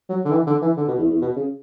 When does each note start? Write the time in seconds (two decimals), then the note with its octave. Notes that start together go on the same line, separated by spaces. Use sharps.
0.09 F#3
0.25 D3
0.32 E3
0.47 D3
0.62 E3
0.77 D3
0.88 B2
0.98 E2
1.09 E2
1.22 B2
1.36 C#3